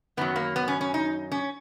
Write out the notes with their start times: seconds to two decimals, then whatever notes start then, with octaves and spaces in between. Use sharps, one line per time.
0.17 F#2 D#3 F#3 B3
0.36 A#3
0.56 B3
0.68 C#4
0.81 C#4
0.94 D#4
1.32 C#4